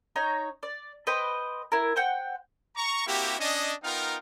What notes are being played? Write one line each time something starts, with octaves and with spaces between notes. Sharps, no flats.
D#4 C#5 A#5
D5
B4 C5 D#5 G5
E4 A#4
C5 F#5 G5
A#5 C#6
A#3 C4 E4 F#4 G4
C#4 D4 D#5
B3 D#4 F4 A#4 F5 G5